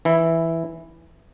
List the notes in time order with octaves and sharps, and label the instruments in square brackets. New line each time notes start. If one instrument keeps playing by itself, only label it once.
[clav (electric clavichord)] E3 E4